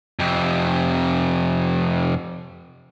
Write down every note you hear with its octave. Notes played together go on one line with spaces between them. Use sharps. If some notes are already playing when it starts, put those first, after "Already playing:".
F2 C3